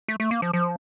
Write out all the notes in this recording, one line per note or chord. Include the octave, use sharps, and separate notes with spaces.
A3
A3
A#3
F3
F3